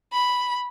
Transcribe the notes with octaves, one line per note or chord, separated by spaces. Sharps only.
B5